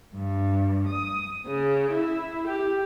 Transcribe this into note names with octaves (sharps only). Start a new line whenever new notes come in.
G2
D#6
C#3
E4
G4